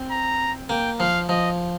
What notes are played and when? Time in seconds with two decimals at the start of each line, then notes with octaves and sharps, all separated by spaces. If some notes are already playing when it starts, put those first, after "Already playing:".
Already playing: C4
0.11 A#5
0.69 A#3 G5
1.00 F3 F5
1.29 F3 D#5